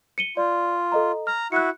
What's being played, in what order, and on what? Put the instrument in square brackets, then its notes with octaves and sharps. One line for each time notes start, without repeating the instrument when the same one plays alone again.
[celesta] C#7 D#7 G7
[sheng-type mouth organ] F4 [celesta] D5
[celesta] A4 D#5 A#5
[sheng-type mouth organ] A#5 [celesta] F6
[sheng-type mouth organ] E4 F#4 [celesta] F#6 C#7